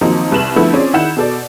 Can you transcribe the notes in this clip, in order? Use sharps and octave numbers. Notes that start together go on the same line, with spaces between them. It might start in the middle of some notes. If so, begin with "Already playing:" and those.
D#3 F3 F#3 A#3 C4 D#4
C2 B4 E7 F#7
D3 F3 A3 B3 E4
C4 C#4 F4 G#4 D5
D#3 E4 F#5 G6 E7
B2 A4 D5